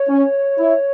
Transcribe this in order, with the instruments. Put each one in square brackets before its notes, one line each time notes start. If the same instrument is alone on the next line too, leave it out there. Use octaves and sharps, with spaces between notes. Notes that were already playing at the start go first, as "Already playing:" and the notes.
Already playing: [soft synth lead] C#5
[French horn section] C#4
E4